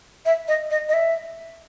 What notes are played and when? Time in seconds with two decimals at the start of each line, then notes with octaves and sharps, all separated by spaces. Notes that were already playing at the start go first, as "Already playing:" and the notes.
0.26 E5
0.48 D#5
0.71 D#5
0.89 D#5
0.94 E5